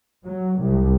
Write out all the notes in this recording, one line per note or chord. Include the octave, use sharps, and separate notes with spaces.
F#3
C2